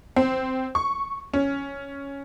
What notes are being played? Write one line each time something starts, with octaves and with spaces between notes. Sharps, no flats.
C4
C#6
C#4